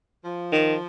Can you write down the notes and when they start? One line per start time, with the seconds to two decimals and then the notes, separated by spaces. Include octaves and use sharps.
0.24 F3
0.52 D#3